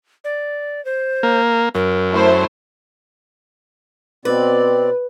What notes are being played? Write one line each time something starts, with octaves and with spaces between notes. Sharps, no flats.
D5
C5
A#3
F#2 A#4
A3 E4 C5
B2 C4 B4 D5